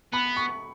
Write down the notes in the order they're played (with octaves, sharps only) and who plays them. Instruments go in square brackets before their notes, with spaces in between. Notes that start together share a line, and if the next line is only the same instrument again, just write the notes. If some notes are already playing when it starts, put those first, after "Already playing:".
[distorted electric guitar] B3 [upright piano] B5
[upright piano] C#6